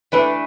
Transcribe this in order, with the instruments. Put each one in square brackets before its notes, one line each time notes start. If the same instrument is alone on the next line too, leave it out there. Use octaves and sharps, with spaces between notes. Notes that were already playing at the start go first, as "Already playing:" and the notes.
[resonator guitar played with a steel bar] E3 A3 D4 [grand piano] B4